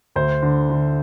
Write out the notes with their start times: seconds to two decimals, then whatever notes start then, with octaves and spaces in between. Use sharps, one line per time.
0.16 D2 C5
0.42 D3
0.70 D3